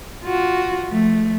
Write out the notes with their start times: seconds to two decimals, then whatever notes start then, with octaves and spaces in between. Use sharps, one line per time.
0.24 F4 F#4
0.89 F3 A3